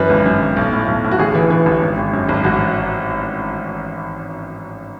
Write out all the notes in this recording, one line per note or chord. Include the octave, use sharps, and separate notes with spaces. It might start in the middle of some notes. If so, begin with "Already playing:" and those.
Already playing: F#2 E3 B4
G#1
F#2
G#1
B1
A2
B1
A2
F#4
A1 G#4
E3
E3
A1
G#1
G#1
F#2
G#1
A1 F#4